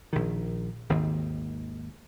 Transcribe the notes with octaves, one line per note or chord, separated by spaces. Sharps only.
A#1 D#3
G#1 D#2